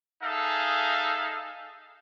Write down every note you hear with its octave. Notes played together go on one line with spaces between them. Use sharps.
D#4 G#4 A4 E5 F5